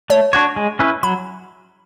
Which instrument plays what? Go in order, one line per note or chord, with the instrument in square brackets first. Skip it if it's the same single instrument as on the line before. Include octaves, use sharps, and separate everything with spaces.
[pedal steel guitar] A3 [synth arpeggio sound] C#5
[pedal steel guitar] D4 F#4 C#5
G#3
C#4 E4 B4
[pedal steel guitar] F#3 [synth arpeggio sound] B5